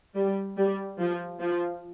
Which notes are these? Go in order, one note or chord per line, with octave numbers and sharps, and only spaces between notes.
G3
G3
F3
F3